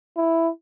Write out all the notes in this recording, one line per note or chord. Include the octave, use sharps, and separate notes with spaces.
E4